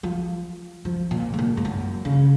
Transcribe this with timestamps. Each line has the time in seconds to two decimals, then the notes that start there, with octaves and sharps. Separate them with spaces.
0.03 F3
0.85 F3
1.11 A#2
1.34 G#2
1.39 A#2
1.57 G#2
1.65 F#2
2.05 C#3